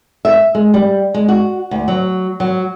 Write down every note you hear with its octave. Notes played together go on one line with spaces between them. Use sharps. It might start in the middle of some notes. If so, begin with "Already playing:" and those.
E5
G#3
G3
G#3
F#4
D2
F#3
F#3